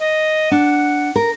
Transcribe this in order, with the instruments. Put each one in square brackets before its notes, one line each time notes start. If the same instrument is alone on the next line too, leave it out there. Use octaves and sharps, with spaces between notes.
[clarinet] D#5
[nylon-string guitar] D4 [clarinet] F#5
[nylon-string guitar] A#4